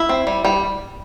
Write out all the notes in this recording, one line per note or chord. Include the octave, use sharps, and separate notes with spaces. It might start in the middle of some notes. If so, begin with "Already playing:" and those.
Already playing: E4
C4
G3
G3